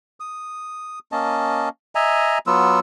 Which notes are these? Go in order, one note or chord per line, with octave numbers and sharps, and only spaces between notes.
D#6
A#3 C#4 D#5 A5
D#5 E5 G#5 A#5
F#3 B3 F4 E6